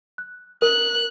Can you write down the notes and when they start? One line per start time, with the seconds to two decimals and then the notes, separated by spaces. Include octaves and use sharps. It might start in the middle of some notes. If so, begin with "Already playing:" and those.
0.18 F#6
0.62 A#4 F#6